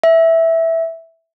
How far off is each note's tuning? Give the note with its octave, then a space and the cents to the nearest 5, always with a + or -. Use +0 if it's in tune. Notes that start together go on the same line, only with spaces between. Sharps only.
E5 -5